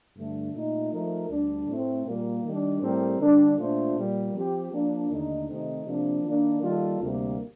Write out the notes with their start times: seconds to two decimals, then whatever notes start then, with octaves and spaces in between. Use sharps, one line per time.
0.16 G2 D3 A3
0.54 A#2 A3 D#4
0.92 F3 A3 D#4 A#4
1.30 D2 D3 G3 D4
1.68 A2 A3 C4
2.07 A#2 G3 A#3
2.44 D#3 G3 D4
2.82 A2 G3 C4 G4 A#4
3.20 D3 G3 D4
3.59 A#2 A3 D4 F4 C5
3.97 A#2 G3 A#3
4.34 F3 C4 G4
4.73 F3 A#3 D4
5.10 D#2 D3 A3 D#4
5.49 C3 D#3 A3 C4 D#4
5.86 C3 F3 A#3 D4
6.24 D#3 A#3 D4
6.62 D#3 G3 A#3 F4 A4
7.01 D2 C3 G3 A#3